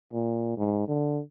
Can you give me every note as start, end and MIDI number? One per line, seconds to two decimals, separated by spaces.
0.13 0.55 46
0.57 0.84 44
0.88 1.20 50